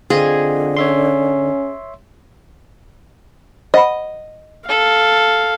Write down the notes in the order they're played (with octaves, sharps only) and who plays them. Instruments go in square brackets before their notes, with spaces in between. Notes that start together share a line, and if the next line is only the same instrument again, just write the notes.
[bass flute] D3 [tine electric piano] C4 F4 D#5 [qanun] G#4
[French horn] C#4 [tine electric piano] C#5 E5 C6
[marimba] C5 F#5 B5 [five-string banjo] D#5
[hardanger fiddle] A4 [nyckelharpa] F5